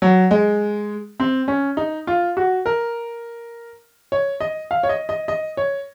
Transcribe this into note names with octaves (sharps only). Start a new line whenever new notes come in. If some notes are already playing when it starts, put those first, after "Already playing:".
F#3
G#3
C4
C#4
D#4
F4
F#4
A#4
C#5
D#5
F5
C#5
D#5
D#5
D#5
C#5